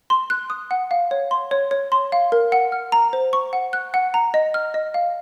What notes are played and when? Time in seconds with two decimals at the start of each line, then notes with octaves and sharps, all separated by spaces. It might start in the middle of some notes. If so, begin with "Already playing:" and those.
0.10 C6
0.30 F#6
0.50 D#6
0.71 F#5
0.91 F5
1.11 C#5
1.31 C6
1.51 C#5
1.71 C#5
1.92 C6
2.12 F5
2.32 A#4
2.52 F#5
2.72 F6
2.92 A#5
3.13 C5
3.33 C#6
3.53 F#5
3.73 F#6
3.94 F#5
4.14 A#5
4.34 D#5
4.54 F6
4.74 D#5
4.94 F5